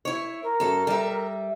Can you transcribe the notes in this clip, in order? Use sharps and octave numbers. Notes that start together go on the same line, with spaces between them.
E4 C#5
A#4
F#2 A4
G3 E5